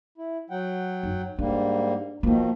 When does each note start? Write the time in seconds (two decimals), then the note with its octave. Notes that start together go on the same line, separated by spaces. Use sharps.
0.18 E4
0.50 F#3 F#5 G5
1.03 F#2 D#4
1.39 G#2 G3 A#3 D4
2.23 B2 D#3 F3 A#3 D#4